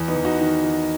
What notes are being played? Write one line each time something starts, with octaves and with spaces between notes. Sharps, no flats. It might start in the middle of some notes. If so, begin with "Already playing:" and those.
Already playing: E2 E3
B3 D#4
E2
D#4 F#4
D#3
D#3